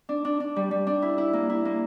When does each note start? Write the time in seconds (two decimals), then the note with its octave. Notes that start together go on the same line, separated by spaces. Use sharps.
0.09 D4
0.25 D4
0.40 D4
0.56 G3
0.71 G3
0.87 D4
1.02 E4
1.18 E4
1.33 A#3
1.49 E4
1.65 A#3